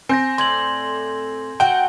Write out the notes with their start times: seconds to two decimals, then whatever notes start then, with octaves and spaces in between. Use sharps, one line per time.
0.09 C4 G#5 G6 A#6
0.38 A2 D5 C6 G#6 F#7
1.60 A3 F#4 F#5 G5